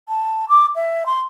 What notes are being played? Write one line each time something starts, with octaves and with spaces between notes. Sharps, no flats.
A5
D6
E5
C6